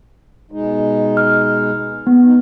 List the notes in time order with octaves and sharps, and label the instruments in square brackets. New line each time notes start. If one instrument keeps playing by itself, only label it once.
[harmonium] B2 G#3 D#4
[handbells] F6
B3
[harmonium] D#4